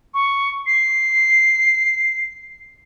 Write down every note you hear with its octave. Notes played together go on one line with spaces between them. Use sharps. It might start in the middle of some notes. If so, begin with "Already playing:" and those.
C#6
C7